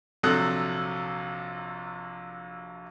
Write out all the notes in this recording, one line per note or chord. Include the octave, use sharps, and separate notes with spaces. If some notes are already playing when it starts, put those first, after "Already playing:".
A#1 C3 F#3 A4 D#6 F#6